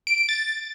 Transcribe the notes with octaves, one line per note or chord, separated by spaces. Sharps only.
D7
D7
A6